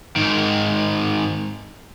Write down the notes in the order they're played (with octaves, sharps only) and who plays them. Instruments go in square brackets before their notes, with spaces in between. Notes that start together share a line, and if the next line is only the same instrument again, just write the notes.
[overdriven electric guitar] G#2 D#3